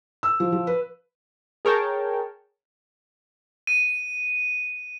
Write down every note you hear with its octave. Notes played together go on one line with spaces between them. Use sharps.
E6
F3
F3
B4
G#4 A#4 C#5 G5 A5
D#7